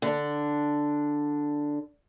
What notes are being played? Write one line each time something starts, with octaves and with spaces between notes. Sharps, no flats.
D3 D4